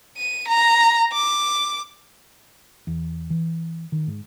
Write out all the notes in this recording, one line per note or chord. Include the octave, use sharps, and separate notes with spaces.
D#7
A#5
D6
E2
E3
D#3
G#2